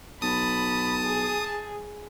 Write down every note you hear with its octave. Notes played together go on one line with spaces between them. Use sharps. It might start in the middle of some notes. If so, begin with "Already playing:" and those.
B1 A5 B5 D#6
G#4